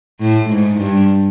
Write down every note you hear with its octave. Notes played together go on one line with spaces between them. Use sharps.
A2
G#2
G2